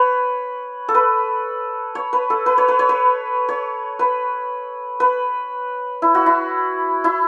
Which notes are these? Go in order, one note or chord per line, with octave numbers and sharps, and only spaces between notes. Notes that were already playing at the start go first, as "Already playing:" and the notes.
Already playing: B4 C#5
A4
B4
C#5
B4
A4
B4
C#5
B4
C#5
B4
C#5
B4
B4
E4
F#4
E4
E4